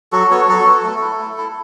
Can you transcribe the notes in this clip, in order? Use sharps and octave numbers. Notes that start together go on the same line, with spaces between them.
F#3 F#4 A4
B3 F#4 A4 C#5
F#3 F#4 A4
B3 F#4
A3
E4
A3
E4